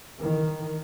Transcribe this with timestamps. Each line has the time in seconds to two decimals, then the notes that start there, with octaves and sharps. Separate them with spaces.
0.19 D#3